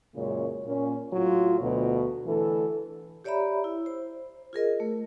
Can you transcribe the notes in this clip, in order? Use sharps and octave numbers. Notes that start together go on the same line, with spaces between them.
F#2 A#2 C#3 G#3 C#5
A#2 C#4
A2 F#3 F4
D2 B2
D3 E3 A3 A4
G4 C#5 D5 E5 A#5 B5
E4
C5
F4 G#4 A#4 D#5
A3